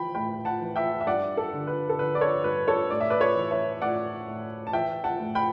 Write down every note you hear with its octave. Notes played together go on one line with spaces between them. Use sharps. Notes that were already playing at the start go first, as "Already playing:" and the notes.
Already playing: E3 G5 B5
A2 G5 B5
F#5 A5
E3
E5 G5
E5
G2 D5 F#5
A4
D3
B4
A4
D3 B4
D5
A4 C#5
G2 B4
A4 C#5
A2 D5
E5
B4 D5
A4 C#5
E3
C#5 E5
A2 D5 F#5
A2
A5
E3 E5 G5
F#5 A5
A2
G5 B5